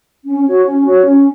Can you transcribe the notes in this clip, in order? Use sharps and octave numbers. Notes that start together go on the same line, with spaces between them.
C#4
F#4 C#5
C#4
F#4 C#5
C#4